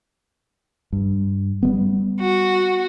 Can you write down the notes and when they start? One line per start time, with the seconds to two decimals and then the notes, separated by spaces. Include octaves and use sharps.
0.93 G2
1.63 G3 G#3 B3
2.20 F#4